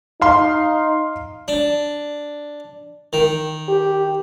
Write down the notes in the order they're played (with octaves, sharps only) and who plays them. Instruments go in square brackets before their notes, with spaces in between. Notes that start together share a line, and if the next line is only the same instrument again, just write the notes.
[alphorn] D#4 [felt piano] F5 C6
[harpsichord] D4
D#3
[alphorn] G4